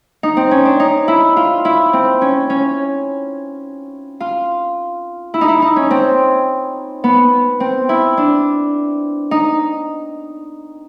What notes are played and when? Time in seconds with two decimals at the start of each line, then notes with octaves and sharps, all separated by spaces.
0.23 D#4
0.37 C4
0.51 C#4
0.65 D4
0.80 D#4
1.08 E4
1.37 F4
1.65 E4
1.93 C4
2.21 C#4
2.50 C#4
4.20 F4
5.34 E4
5.41 D#4
5.48 E4
5.62 D#4
5.76 C#4
5.91 C4
7.04 B3
7.60 C4
7.89 E4
8.17 D4
9.31 D#4